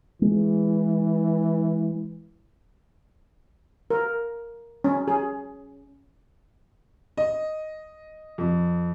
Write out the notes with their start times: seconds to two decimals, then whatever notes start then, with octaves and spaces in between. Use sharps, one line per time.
0.22 E3 G#3
3.90 A#4
4.84 C#4
5.08 G#4
7.17 D#5
8.38 F2